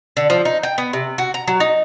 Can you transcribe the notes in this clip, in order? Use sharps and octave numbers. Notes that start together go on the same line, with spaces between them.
D3
F3
D#4
G5
B3
C3
F#4
A#5
F#3
D#4